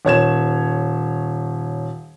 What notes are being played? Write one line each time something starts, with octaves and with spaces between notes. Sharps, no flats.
D#1 C#5 G#6 E7